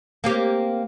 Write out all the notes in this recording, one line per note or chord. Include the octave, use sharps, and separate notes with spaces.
A#3 C4 G4